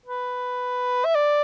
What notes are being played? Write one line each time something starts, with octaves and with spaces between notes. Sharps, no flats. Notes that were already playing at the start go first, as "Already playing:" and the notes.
B4
E5
D5